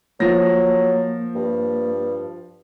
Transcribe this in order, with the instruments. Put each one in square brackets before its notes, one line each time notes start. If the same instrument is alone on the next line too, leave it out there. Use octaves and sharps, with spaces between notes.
[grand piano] F3 A#6 [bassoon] F#3 [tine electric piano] A#3
[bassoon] G2